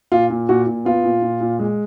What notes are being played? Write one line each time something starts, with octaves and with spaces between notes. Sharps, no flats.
A#2 F4
A#2
A#2 F#4
A#2
B3 F4
A#2
A#2
A#2
G#3